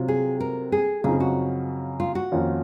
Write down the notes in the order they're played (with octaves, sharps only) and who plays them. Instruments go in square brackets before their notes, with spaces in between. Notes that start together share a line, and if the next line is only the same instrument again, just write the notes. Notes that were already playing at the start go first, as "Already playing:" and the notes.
Already playing: [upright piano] C3 F#3 C4 F4
[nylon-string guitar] G#4
A#4
G#4
[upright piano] F#2 C#3 F3 C4 D#4 [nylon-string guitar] G#4
[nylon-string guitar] F#4
F4
F#4
[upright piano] F2 D#3 A#3 C#4 F4